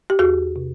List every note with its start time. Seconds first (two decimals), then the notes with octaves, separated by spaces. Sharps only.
0.10 G4
0.19 E2 F#4 G#4
0.56 C3